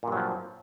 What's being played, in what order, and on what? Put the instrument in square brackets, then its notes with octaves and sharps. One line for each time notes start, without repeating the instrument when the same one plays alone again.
[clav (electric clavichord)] A#2
G2
F#3
F3